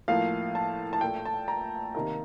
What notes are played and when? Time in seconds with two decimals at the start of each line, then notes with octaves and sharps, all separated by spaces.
0.08 A2 F3 A#3 F5
0.55 A5
0.93 A5
1.01 A#2 A3 G5
1.25 A5
1.48 A#5
1.95 C3 D#3 A#3